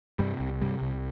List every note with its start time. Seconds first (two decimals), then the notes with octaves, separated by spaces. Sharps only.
0.19 G2 C3 G3
0.40 C2
0.61 G2 C3 G3
0.81 C2